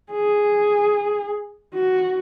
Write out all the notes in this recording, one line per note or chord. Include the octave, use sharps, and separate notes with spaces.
G#4
F#4